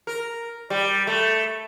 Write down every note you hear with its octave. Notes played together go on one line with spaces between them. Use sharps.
A#4
G3
A3